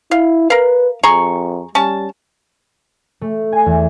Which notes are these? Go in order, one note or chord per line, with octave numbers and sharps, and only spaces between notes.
E4 F5
A#4 B4 F5
F2 G#4 A#5 C#6
G3 C#4 A5
A3
G#5
E2